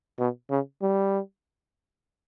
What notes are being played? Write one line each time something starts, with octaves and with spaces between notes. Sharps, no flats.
B2
C#3
G3